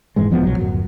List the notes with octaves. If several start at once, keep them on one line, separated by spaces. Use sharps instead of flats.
F1 G#2 E3 G#3
E1 E2 F3 B3
B1 F#3
D1 F#2